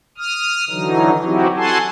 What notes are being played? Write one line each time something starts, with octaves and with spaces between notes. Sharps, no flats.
D#6 F6
D3 E3 F#3 D#4
F#3 C4 D#4 E4 F#4 G4
F#4 A4 F#5 G#5 A5 C6